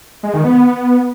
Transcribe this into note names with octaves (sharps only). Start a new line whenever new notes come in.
G#3
D#3
B3